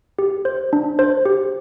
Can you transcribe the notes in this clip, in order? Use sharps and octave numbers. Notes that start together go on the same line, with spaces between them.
G4
C5
D4
C5
G4